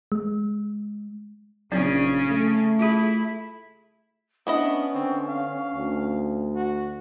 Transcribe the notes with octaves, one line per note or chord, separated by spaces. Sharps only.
G#3
A#1 C#3 F#3 C4 C#4 D#4
A3
E4 F4 G#4
B3 C#4 D4 E4 D#5
D3 C4
F5
D2
F#4